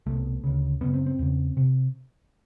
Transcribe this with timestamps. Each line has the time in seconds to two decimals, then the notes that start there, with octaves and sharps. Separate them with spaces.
0.06 C2 B2 A3
0.44 D2 C#3
0.81 F#2 C#3 B3
0.94 C4
1.06 C4
1.19 E2 C#3
1.57 C3